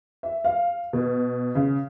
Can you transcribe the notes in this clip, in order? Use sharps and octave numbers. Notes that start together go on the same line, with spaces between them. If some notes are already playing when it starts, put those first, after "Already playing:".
E5
F5
B2
C#3